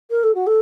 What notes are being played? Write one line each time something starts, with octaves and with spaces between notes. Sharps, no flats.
A#4
A4
F#4
A4